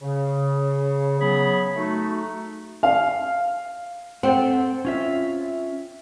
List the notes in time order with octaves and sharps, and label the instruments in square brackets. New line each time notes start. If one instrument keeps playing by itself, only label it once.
[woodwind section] C#3
C#3 F#3 B3 G#4 B5
A3 D#4 F#4
[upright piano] F5
[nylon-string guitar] C4 [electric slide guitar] A4 C5 F#5
[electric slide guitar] C#4 F4 E5